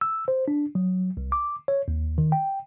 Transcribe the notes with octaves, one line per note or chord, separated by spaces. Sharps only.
E6
C5
D4
F#3
C2
D6
C#5
D#2
D#3
G5